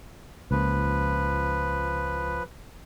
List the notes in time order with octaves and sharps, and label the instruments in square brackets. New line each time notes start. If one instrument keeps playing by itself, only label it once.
[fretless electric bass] C#2 A#3 [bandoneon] F3 B4